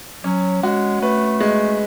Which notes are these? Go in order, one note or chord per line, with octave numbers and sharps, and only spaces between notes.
F#3 C#4
G#3 F#4
A3 B4
G#3